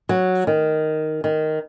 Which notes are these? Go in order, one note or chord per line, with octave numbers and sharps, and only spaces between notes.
F#3
D#3
D#3